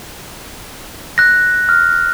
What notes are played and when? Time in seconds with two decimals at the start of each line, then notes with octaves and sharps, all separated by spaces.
1.18 F#6 A#6
1.69 F6